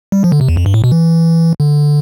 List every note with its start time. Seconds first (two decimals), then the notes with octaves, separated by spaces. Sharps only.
0.12 G3
0.24 F3
0.32 D3
0.41 C3
0.49 E2
0.57 F2
0.66 G2
0.74 A2
0.84 B2
0.92 E3
1.60 D3